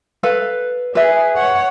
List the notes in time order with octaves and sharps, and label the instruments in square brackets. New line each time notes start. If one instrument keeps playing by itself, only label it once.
[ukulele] A4 B4 F5
[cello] G#4 [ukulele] B4 E5
[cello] C#5 F#5